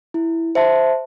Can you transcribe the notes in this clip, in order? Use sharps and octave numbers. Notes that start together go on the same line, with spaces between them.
E4
C5 E5 A5